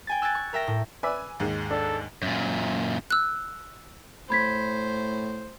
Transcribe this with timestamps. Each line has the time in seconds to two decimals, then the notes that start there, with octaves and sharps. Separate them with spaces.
0.07 G5 G#5 A6
0.22 E6 F#6 G#6 A6 D7
0.35 C#6
0.53 A#4 E5 G5 A#6
0.67 A2
1.03 B4 D5 E5 G#5
1.40 D#2 G#2 G#3
1.71 D4 A4
2.22 F#2 A#2
3.10 E6 F#6
4.30 A2 C5 B5 G#6 B6